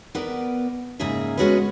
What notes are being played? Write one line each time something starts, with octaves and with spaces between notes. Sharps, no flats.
B3 A#4 B4 D5
G#2 C#3 A#3 G#4 E5
G#3 B3 C#4 F#4 G#4 B4